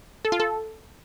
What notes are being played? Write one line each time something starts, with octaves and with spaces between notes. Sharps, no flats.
A4
F4
A4